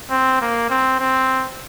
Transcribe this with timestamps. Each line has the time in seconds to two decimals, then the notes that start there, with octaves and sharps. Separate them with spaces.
0.11 C4
0.41 A#3
0.70 C4
1.00 C4